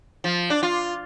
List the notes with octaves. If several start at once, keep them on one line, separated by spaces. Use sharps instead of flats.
F3
D4
F4